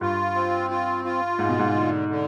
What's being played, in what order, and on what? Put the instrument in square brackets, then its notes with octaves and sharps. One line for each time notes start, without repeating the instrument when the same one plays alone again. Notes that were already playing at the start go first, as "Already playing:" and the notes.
[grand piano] G2 [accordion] F4
[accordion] C4
F4
F4
[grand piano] G#2 [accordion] G#3
[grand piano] B2
G#2
[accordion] D3
D3